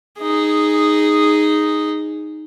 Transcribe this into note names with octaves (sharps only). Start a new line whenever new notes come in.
D#4 G#4